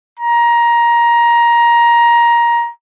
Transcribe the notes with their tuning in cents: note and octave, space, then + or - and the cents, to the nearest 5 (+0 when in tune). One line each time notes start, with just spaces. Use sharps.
A#5 +15